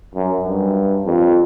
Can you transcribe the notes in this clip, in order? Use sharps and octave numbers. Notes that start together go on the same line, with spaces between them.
F#2
G2
F2